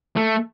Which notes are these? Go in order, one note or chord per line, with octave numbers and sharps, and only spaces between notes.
A3